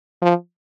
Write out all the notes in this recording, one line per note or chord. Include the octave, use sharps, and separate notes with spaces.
F3